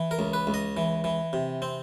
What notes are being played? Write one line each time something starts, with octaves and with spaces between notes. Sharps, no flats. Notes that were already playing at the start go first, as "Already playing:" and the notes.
Already playing: E3
A#4
C#2
B4
C#2
D#5
E3
E3
C3
C4